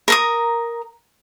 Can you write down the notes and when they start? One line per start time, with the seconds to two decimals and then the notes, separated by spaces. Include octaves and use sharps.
0.08 A#4 A#5 D#6